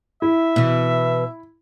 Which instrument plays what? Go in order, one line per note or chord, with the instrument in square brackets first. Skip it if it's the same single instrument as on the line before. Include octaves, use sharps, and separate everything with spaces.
[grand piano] E4 [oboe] E5
[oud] B2 E3